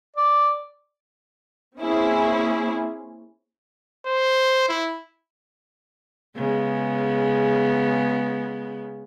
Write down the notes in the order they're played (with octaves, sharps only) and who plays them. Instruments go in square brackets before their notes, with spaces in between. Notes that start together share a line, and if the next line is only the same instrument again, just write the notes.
[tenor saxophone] D5
[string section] A#3 C4 C#4 E4 G#4
[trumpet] C5
E4
[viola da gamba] C#3 G#3 B3